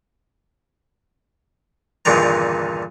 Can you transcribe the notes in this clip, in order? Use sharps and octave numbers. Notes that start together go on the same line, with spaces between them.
E2 G2 A#2 D3 D#3 A#5